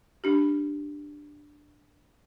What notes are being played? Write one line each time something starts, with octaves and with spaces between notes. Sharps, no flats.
D4 G4